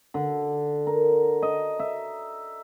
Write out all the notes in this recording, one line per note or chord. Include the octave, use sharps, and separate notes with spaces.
D3
A#4
D#5
E5